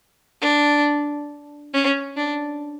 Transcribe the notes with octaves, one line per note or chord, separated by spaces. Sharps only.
D4
C#4
D4